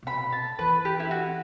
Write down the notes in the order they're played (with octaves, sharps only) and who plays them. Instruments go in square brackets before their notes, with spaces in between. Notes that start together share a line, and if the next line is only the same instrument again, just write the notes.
[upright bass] C3
[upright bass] B2 [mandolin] B5
[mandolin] A5
[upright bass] E3 [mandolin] B4
[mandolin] G4
E4
F#4